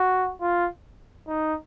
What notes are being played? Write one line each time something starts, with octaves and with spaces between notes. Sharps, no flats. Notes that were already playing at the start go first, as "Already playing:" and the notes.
Already playing: F#4
F4
D#4